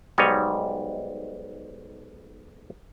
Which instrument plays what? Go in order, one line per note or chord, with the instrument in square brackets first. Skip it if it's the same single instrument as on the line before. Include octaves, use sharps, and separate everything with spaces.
[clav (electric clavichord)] B1 G#2 G3 C#5 D#5